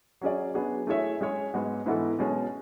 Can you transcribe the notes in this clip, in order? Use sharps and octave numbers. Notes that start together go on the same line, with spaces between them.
F#3 C#4 G#4 D5
F#3 B3 D4 G#4
A3 E4 G#4 C#5 E5
G#3 C#4 G#4 C#5
G#2 G#3 B3 F#4
G#2 E3 B3 F#4 A4
B2 G#3 C#4